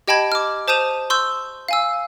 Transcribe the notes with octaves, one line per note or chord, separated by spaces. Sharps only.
G4 D#5 G5 A5 B5 G#6
D6 F6
C5 A5 D#6 G6 D#7 F7
C6 C#6 E6 G6
F5 G#5 E6